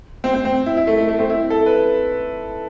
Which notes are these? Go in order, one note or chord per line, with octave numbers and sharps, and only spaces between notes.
C4
C4
C4
E4
E4
A3
A3
A3
C4
E4
A4
B4